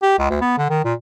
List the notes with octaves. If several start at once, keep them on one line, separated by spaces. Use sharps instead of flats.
G4
C#2
D2
B3
D3
D#3
A#2